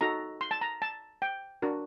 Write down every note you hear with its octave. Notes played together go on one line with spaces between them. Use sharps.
D#4 F#4 A4 A#5
C6
A5
A#5
A5
G5
D4 F#4 A#4